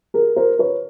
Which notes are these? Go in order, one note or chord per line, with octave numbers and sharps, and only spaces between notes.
G#4 A#4
A#4 C5
B4 C#5